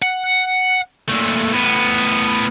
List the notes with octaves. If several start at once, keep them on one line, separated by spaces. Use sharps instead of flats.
F#5
A#2 A3
A2 B3